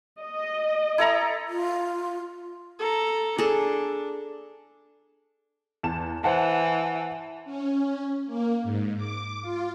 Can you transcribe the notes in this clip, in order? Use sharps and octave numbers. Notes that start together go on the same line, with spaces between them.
D#5
E4 A4 A#5
F4
A4 A#5
D4 G#4 A4
E2 A5 E7
E3 C5 F#5 A5
C#4
A#3
G#2
D6
F4